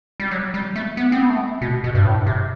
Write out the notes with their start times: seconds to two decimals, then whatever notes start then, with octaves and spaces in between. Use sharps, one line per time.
0.20 G3
0.31 F#3
0.54 G3
0.76 A3
0.97 B3
1.12 C4
1.21 B3
1.29 A3
1.61 B2
1.84 B2
1.95 G2
2.05 A2
2.26 C3